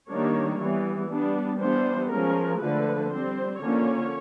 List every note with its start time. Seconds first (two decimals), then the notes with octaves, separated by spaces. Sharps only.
0.09 D#3 G3 A#3 D4 C#5
0.59 E3 G3 B3
1.09 G3 B3 D4
1.60 E3 G3 B3 D4 C5
2.10 F3 G#3 C#4 A#4
2.61 D3 F3 A3 B4
3.10 G3 C4 C5
3.61 D3 F3 A#3 C#4 C#5